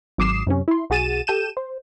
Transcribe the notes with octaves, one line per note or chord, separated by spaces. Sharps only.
G#1 F#3 D6 D#6 C7 E7
F#2 C3 C#4
E4 C6
B1 F#4 G#4 A6 D#7 E7
G4 A4 G6 D#7 E7
C5